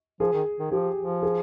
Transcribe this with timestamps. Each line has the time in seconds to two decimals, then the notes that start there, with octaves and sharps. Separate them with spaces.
0.20 F3 G#4
0.33 D#3
0.59 D#3
0.71 F3 G4
0.98 F3
1.22 G#4